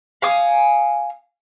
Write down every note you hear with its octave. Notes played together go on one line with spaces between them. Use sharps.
F5 G#5 D#6